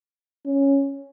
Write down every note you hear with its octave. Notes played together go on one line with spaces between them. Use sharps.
C#4